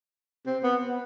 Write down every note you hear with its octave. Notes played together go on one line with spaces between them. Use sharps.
C4
B3